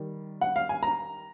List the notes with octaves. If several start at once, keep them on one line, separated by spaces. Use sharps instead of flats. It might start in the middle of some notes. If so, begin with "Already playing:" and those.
Already playing: D#3 G3
F#5
F5
G#5
A#5